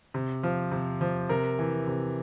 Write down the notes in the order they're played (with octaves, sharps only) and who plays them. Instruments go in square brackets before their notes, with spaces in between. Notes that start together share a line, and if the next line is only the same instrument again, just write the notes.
[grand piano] C3
F3
C3
F3
C3 A#4
E3
C3